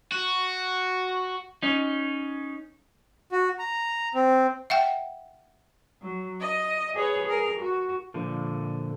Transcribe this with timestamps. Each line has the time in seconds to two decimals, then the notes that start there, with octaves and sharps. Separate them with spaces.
0.12 F#4
1.63 C#4 D#4
3.32 F#4
3.59 A#5
4.15 C4
4.70 E5 F#5 G5
6.02 F#3
6.41 D#5
6.95 G#4 B4 C#5
7.26 G#4 A#4
7.59 F#4
8.14 A#2 D3 F3